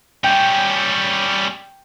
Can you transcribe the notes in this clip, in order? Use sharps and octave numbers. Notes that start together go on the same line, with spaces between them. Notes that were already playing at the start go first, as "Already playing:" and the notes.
G3 C#4 G5